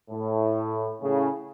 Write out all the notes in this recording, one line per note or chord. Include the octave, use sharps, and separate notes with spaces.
A2
A2 C#3